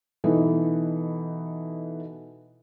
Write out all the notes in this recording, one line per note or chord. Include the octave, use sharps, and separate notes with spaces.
B2 E3 D#4 A4 B4